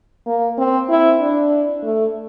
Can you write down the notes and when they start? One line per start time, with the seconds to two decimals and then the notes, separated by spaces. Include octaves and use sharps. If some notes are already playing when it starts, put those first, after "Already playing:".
0.26 A#3
0.58 C4
0.89 E4
1.20 D4
1.83 A3